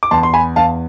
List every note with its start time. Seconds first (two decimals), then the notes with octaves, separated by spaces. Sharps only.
0.03 D6
0.11 E2 A5 C6
0.23 C6
0.34 G#5 B5
0.56 E2 F5 A5